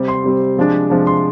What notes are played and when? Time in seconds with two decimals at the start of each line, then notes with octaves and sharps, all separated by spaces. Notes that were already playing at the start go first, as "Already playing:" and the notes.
Already playing: C3 G3 C4
0.08 C6
0.24 C3 G3 C4
0.57 C3 F3 G#3 D4
0.90 C3 F3 G#3 D4
1.07 C6